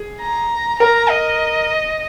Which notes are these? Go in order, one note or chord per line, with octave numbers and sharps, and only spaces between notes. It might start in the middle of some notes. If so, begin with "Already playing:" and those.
Already playing: G#4
A#5
A#4 A#5
D#5